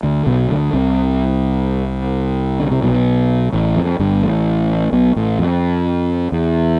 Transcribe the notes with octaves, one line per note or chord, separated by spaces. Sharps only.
D2 D3
B1 B2
D2 D3
C2 C3
D3
C3
B1 B2
A1 A2
F2
G1 G2
A1 A2
B1 B2
A1 A2
F2
E2